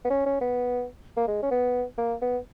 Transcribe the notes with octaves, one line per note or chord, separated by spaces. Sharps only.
B3
C#4
C#4
B3
A#3
G#3
C#4
B3
A#3
B3